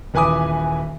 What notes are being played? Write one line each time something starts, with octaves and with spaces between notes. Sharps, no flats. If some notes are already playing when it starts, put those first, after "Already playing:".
D#1 E3 B4 G#5 D6 D#6